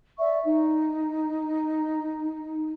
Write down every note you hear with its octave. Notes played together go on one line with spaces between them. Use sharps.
D5 E5 C#6
D#4